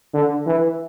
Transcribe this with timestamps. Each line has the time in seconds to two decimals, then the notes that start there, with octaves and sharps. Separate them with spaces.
0.14 D3
0.46 E3